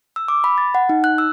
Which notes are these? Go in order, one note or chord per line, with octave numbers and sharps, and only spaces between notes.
E6
D6
B5
A6
F#5
D#4
F#6
E6